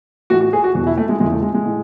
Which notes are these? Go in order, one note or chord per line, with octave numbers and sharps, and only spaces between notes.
A2 E3 F#4
F#4
G#4
F#4
E2 B2 F#4
E4
A3
G#3
E2 C#3 E3 G#3
A3
G#3
G#3
A2